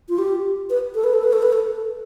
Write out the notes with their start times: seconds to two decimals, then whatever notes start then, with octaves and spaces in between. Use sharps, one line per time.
0.09 F4
0.18 G4
0.70 B4
0.95 A4
1.04 B4
1.13 A4
1.23 B4
1.33 A4
1.42 B4
1.53 A4